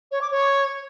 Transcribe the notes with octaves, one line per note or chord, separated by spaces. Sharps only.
C#5
D6
C#5